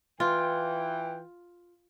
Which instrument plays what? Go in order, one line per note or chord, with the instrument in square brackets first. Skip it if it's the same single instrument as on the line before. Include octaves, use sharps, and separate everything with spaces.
[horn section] E3 G5 [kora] F4